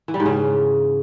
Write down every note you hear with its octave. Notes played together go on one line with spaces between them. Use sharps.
E3
G3
G#2
C#3